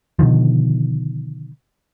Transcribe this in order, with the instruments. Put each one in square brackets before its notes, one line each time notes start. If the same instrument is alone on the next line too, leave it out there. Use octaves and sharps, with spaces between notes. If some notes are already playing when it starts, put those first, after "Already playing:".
[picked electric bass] B2 D3 D#3 F3